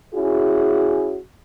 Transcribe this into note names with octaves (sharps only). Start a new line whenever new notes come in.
C#4 E4 F#4 G#4